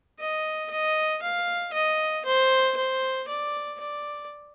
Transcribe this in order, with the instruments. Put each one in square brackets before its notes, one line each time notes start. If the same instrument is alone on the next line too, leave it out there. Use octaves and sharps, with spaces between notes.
[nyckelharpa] D#5
D#5
F5
D#5
C5
C5
D5
D5